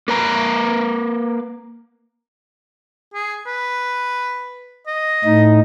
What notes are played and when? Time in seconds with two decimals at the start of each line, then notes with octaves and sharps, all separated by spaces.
0.08 A#3 B4 A#5
3.14 G#4
3.46 B4
4.87 D#5
5.25 A2 D#4